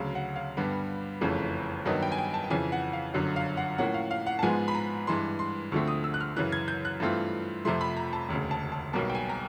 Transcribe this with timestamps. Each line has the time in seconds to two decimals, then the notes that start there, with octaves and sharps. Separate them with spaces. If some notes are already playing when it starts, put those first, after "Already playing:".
Already playing: D2 C#3 F#3 F5
0.15 F#5
0.36 F5
0.57 G2 D3 G3 B3
1.21 F#1 F2 C#3 E3 A3
1.85 G2 D#3 F#3 B3 D#5
2.03 G5
2.12 G#5
2.18 G5
2.34 A5
2.44 G5
2.50 F2 C#3 E3 G#5
2.72 F#5
2.93 F5
3.14 G1 F#2 D3 F#3
3.36 F5
3.57 F#5
3.78 A2 F3 A#3 C#4 F#5
3.94 F5
4.11 F5
4.26 F#5
4.39 A5
4.43 G#2 F3 G#3 B3 G#5
4.68 B5
4.75 A#5
5.07 G2 E3 G#3 C6
5.39 C6
5.72 D2 D3 F3 A3 C4 C#6
5.88 D#6
6.04 E6
6.14 F#6
6.21 F6
6.37 F#2 C#3 E3 F#6
6.52 G#6
6.68 G6
6.85 F#6
7.00 G2 E3 A3 C4 F4
7.65 F2 C3 F3 A3 C6
7.81 B5
7.97 A#5
8.13 A5
8.29 E1 D2 C#3
8.51 A5
8.72 A5
8.93 B1 B2 G3 A#3 A5
9.10 G5
9.15 G#5
9.29 A#5